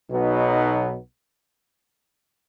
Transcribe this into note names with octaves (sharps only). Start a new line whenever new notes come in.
B1 B2 F#3 B3 D#4